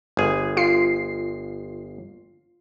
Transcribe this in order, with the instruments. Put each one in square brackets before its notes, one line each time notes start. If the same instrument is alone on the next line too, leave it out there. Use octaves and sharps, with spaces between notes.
[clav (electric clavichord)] G1 G#4
[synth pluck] F4 C7